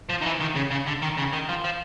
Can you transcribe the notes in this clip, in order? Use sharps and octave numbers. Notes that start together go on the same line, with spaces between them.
F3
D#3
E3
D#3
C#3
C#3
D3
D#3
C#3
D#3
F3
F3